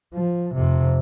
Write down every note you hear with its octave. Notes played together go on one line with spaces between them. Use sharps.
F3
F2 C3